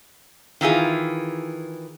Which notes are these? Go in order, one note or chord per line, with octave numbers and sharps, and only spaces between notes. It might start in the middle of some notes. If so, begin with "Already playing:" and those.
D#3 E3 F4 G#4